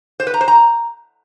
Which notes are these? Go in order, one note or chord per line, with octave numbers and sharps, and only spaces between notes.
C5
B4
A#5
C5
A#5